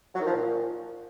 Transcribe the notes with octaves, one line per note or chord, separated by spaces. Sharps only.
F#3
D#3
F3
A#2